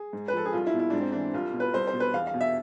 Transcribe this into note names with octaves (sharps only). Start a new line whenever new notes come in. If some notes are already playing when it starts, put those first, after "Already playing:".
Already playing: G#4
G#2
B4
F3 A4
G#4
C2 F4
E4
B2
E4
G#2 D4
C4
E3 D4
C2 F4
B2
B4
C2 C5
C5
B2
B4
E2 F5
F5
B2
E5